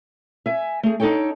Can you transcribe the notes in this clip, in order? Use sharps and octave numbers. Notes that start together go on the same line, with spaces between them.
E5 G#5
A3 G#4
D4 D#4 F#4 A4 C#5 G5